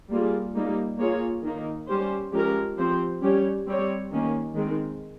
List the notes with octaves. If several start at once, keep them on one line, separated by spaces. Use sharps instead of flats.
G3 A#3 F4 G#4
G3 A#3 D#4
A#3 F4 G#4 C#5
D#3 A#3 D#4
G3 C#4 G4 C5
F3 G#3 C#4 G4 A#4
F3 C4 G4 C5
G3 C#4 G4 C#5
G3 C4 G4 C#5
D#3 A#3 C#4
D#3 G#3 C4